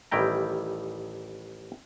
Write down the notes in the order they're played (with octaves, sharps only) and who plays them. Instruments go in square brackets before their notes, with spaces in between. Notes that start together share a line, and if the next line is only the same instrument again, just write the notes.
[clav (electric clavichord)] A1 D#3 G3 E4 G5 A#5